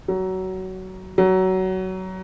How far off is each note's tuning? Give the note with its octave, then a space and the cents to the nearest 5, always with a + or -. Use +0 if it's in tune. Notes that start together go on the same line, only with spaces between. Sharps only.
F#3 +20
F#3 +20